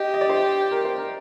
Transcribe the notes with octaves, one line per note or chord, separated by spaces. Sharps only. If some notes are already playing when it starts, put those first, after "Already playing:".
Already playing: G4 D#5
D#5
D5
C5
A#4
C5
A#4